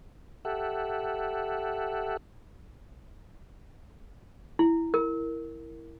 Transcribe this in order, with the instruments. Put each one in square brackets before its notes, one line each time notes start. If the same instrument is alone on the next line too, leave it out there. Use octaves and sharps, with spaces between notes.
[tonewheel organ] G4 A4 E5 F#5
[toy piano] E4
A#4